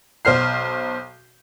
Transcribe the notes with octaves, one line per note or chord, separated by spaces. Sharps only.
B1 C5 F6 C7